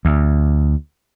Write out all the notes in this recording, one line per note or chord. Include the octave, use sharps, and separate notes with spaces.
D2